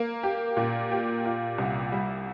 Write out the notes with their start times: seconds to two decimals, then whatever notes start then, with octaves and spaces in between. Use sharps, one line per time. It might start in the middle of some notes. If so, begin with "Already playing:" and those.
Already playing: A#3
0.23 G4
0.57 A#2
0.91 G4
1.25 F4
1.58 C2
1.92 G3